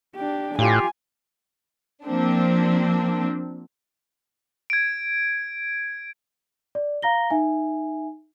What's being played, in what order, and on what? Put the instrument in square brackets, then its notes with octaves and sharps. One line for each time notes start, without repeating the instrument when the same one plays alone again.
[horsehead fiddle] D4 G4
[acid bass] A2 [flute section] F4 G4 F5 [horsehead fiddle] G#5
[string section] F3 A#3 C4 D4
[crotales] G#6 D7
[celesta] D5
F5 A#5 A#6 G7
D#4 E5 G#5